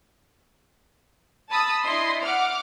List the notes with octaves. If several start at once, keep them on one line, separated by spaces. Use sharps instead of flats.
A5 B5 D#6 E6
D4 E4 D#5 C6 C7
F#5 D6 F6